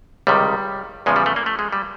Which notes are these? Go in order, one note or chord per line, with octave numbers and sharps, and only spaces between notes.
C#2 C3 D#3 G3
E2 C#3 F3 G#3
G3
A3
A#3
A3
G#3
G3